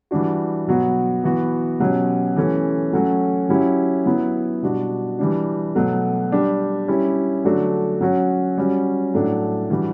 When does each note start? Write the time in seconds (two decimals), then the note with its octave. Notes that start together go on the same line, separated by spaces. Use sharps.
0.11 E3 G3 D4 F#4
0.67 B2 F#3 B3 F#4
1.24 E3 B3 F#4
1.80 B2 F#3 C#4 G4
2.37 E3 A3 C#4 G4
2.93 F#3 A3 C#4 F#4
3.49 F#3 C#4 E4 G4
4.06 F#3 B3 E4
4.62 B2 G3 D4 F#4
5.19 E3 G3 D4
5.75 B2 F#3 A3
6.32 G3 D4 G4
6.88 G3 C#4 E4 G4
7.44 D3 F#3 A3 D4 F#4
8.01 F#3 C#4 F#4
8.58 G3 C#4 F#4
9.14 A2 F#3 A3 D4
9.70 E3 G3 D4 F#4